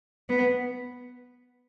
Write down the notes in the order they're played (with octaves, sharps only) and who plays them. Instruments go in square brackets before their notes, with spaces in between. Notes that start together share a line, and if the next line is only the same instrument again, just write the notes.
[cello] B3